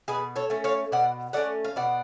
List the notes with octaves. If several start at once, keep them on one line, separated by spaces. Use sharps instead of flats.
B2 G#4 B4
A4 C#5
A3 C#4
C#5 F5
B2 D5 F#5
A3 C#4 D5 F#5
F5
B2 D5 F#5